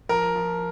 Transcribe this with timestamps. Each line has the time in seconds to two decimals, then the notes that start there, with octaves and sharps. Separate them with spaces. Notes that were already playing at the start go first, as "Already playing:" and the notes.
0.09 F3 A#4
0.35 F3